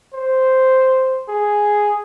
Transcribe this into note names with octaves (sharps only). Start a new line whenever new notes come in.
C5
G#4